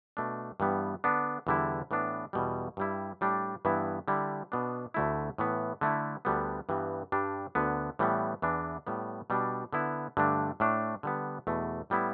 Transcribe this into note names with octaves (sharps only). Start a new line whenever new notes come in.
B2 A3 D4
G2 E3 G3 B3
D3 B3 D4
E2 D3 G3 E4
A2 E3 B3 D4
E2 B2 G3
G2 G3 E4
A2 G3 D4
G2 E3 B3 E4
D3 G3 E4
B2 B3 D4
D2 D3 A3 E4
A2 E3 B3
D3 A3 E4
D2 D3 G3 B3
G2 E3 G3 B3
G2 G3 D4
D2 D3 B3
A2 E3 G3 B3
E2 E3 B3 D4
A2 G3 B3
B2 G3 D4
D3 B3 E4
G2 D3 A3 D4
A2 A3 D4
D3 G3 B3
E2 B2 A3
A2 G3 B3 E4